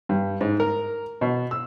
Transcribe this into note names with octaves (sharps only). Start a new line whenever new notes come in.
G2
G#2
A#4
B2
E6